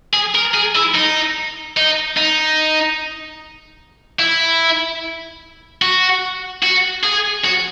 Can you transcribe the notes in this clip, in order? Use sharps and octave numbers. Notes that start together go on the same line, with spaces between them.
G#4
A#4
G#4
E4
D#4
D#4
D#4
E4
F#4
F#4
G#4
F#4